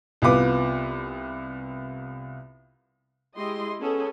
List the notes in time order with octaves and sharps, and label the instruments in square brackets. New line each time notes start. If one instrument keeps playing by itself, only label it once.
[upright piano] C2 B3 F4 B4 D6
[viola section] G#3 E4 G4 D#5 C6
B3 C#4 G#4 A4